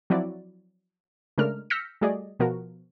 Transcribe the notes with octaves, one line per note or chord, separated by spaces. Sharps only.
F3 F#3 C4 E4 F#4 D5
C#3 G#3 A3 D4 A#4 F6
E6 F6 G6 A#6 B6 C#7
G3 A3 F#4 G#4 D5 D#5
B2 F3 B3 F#4 A#4